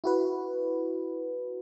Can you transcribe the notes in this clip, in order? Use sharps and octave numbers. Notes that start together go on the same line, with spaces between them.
E4 F#4 B4